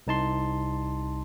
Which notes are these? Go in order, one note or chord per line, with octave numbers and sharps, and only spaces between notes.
C2 D#4 A5 C6